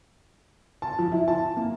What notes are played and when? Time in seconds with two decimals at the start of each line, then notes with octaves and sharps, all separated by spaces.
0.82 A5
0.99 F3
1.12 E4
1.28 A5
1.57 A#3